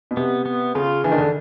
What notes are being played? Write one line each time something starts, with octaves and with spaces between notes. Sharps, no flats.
B2
C3 B3
B3
C#3 F4
E3 D4
D#3
D3